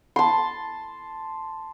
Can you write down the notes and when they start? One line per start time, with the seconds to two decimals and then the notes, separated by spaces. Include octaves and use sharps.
0.16 A5 C6